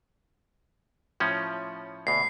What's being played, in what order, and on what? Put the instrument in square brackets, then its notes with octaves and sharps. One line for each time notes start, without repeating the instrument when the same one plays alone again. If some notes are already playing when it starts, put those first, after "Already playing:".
[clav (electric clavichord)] A2 F3 C#4
[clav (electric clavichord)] D2 B2 [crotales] C7